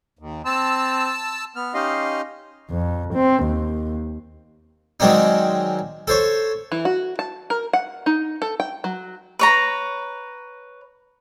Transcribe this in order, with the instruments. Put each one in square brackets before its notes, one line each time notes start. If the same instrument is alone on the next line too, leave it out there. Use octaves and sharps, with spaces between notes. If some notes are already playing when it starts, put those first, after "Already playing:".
[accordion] D#2
[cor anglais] C4 [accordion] A5 E6
[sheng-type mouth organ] B3 F6
C#4 D#4 G4 D#5 F5 C6
[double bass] F2
C4
D#2
[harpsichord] D#3 F#3 G#3 C4 D4 D#4
A4 C5 C#5
[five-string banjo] E3
F#4
A5
A#4
F#5
D#4
A4
G5
F#3
[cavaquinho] B4 C#5 A#5